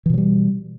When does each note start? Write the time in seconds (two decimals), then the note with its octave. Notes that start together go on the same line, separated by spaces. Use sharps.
0.06 E3
0.10 B2
0.14 F#3
0.18 G3